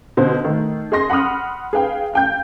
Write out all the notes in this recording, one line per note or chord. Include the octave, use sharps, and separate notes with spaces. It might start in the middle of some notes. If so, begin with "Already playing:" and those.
B2 D3 C5
D#3 A3
G#4 D#5 C6 A#6
F#5 B5 C6 D#6 F6
G#4 B4 F5 G5
F5 G5 G6